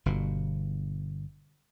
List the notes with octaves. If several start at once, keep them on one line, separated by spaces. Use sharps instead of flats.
G1 B2